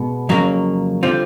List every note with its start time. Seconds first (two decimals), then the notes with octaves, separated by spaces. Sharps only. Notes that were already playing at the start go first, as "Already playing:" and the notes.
Already playing: B2 G#3 B3
0.29 F2 C#3 F#3 A#3
1.03 D3 G3 C4 F4